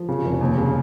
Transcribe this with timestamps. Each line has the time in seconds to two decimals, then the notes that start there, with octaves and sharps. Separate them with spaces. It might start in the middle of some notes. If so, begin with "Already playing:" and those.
Already playing: F3
0.09 C#3
0.25 F1
0.41 D#2
0.58 C#3